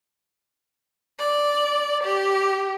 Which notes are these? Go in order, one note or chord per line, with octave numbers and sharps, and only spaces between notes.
D5
G4